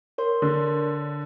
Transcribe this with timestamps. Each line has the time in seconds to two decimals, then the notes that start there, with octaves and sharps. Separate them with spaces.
0.18 A#4 C#5 C6
0.42 D3